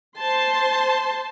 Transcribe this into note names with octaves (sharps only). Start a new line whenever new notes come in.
C5 A5 C6